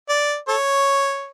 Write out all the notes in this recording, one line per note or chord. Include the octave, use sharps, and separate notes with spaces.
D5
A4 C#5